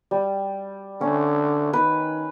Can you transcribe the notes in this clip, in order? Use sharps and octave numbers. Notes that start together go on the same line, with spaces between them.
G3
D3 C#4
D#3 B4